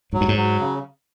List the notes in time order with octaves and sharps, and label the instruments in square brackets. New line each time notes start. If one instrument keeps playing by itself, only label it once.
[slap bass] G#2 [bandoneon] F#3
[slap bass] G2
G#2
[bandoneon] F#3
C#3